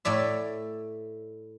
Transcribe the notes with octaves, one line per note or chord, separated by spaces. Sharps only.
A2 A4 D5 E5